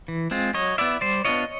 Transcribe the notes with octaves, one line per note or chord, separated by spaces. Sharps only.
E3
G#3 C4 F4
F#3 C#5 D#5
B3 E4 D5 E5
G3 C5 D5
B3 D4 F4 C#5 D#5